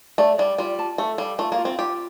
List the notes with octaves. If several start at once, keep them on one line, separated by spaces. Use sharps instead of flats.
A3 D5
G3 D5
G3 F4
A5
A3 A4
G3 F5
A3 F4
A#3
F4
C4
F4 G4